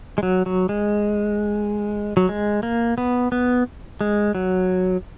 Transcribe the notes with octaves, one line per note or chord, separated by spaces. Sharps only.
G#3
F#3
F#3
G#3
F#3
G#3
A#3
B3
B3
G#3
F#3